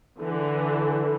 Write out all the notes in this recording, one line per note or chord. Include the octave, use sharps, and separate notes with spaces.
D3 E3